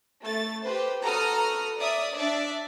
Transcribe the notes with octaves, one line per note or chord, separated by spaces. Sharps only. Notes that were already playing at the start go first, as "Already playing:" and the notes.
A3 A6
G4 B4 C5
F#4 A4 B4 A#5 D#6 F6
D5 E5 D#6
D4 D5 E5